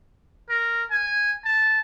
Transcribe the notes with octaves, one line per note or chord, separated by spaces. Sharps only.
A#4
G#5
A5